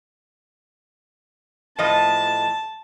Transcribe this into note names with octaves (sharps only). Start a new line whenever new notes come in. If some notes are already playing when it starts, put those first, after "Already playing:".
A2 F3 D#5 A5